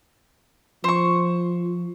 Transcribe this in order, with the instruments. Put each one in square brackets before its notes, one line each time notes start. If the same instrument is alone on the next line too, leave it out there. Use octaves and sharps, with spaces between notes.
[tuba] F3 [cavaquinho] C5 C#6